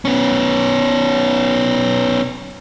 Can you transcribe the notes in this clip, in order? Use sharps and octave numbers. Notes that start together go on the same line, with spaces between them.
B3 C#4